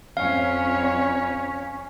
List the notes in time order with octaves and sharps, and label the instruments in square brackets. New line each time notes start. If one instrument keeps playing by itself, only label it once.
[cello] F2 C#5 [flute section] C#4 [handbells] F5